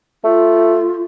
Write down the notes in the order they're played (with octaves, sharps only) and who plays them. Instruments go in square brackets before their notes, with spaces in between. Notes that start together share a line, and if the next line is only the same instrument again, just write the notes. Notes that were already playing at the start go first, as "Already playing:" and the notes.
[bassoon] A3 [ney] F4